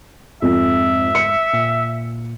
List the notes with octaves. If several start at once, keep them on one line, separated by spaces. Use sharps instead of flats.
F2 G#2 E5
C#7
A#2